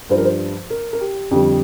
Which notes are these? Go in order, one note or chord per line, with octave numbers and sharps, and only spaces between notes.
G2 F3 C5
A#4
C5
A#4
A#4
G4
F2 D3 G3 G4